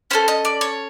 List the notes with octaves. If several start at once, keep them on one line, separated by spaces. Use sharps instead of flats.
C#4 F4 A4 C5
D#5
D5
C#5